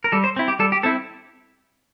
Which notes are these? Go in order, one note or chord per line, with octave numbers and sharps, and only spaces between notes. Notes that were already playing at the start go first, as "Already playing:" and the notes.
A#4
G3 A4
C5
C4 E4
G4
G3 A4
G4
C4 E4 A4